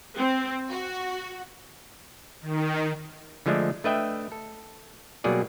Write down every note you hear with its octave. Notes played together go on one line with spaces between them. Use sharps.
C4
F#4
D#3
D3 F3 G#3 A3 D4
A3 D4 B4 D#5 E5 G5
A4
B2 F#3 G3 A#3 G#4 D5